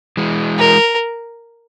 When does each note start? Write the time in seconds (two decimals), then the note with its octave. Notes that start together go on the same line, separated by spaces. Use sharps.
0.17 E3 G#3
0.59 A#4